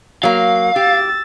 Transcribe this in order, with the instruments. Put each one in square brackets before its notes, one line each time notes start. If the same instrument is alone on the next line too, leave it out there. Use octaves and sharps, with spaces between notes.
[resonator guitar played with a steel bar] F#3 A#3 [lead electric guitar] F5
[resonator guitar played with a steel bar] G4 [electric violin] E6 A6